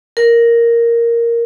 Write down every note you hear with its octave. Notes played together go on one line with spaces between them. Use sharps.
A#4